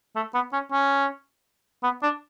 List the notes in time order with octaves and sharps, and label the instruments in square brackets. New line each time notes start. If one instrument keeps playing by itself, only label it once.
[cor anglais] A3
B3
C#4
C#4
B3
D4